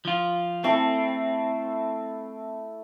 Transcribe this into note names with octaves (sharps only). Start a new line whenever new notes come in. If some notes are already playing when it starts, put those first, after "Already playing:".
F3 F4
A3 C4 E4 A4